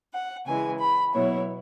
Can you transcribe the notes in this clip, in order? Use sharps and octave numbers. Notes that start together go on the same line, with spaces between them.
F#5
C#3 E3 G#3 G#5
B5
B2 F#3 B3 E4 C#5